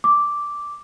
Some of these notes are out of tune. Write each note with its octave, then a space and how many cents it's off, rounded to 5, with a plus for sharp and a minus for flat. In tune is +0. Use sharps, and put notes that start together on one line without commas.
D6 -5